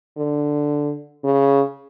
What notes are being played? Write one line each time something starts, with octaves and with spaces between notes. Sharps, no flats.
D3
C#3